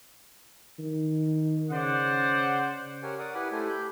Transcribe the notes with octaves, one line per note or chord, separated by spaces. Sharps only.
D#3
C#3 C5 D5 F#5
G4 A#4 C#5 F#5 G#5
A#4 D5 F#5 D#6
E4 G4 B4 F#5 G#5 B5
A3 E4 G4 A4 C5 G#5
G4 B5 G6